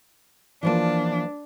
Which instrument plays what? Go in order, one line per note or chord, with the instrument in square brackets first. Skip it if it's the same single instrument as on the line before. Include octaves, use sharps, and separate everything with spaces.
[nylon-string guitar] E3 F3 A#3 [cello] D4